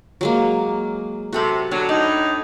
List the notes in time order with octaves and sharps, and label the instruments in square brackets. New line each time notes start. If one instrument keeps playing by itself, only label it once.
[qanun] F#3 G#3 A#3
[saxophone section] C3 [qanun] F#4 A4 B5
[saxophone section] D3 F#3 [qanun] D4
[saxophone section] A2 D#4 [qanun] D5